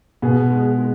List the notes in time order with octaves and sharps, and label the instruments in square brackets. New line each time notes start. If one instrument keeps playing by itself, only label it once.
[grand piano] B2 B3 [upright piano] G#4
[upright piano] G#3
G#3